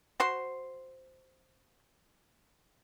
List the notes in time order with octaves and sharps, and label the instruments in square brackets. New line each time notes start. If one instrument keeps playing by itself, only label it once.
[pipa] F#4 C5 C6